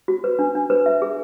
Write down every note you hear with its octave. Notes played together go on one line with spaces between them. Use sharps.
F#4
B4
D4
D4
B4
E5
G#4